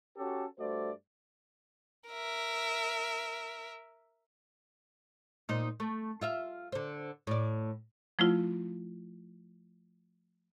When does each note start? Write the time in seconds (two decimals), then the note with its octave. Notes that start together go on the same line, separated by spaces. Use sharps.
0.17 C#4 F#4 G4 A4
0.59 G2 A3 F#4 C5 D5
2.08 A#4 E5
5.49 A#2 D#4 C5
5.80 A3
6.21 F4 E5 F5
6.72 D3 C5
7.27 A2 D5
8.19 F3 A3 E4 F4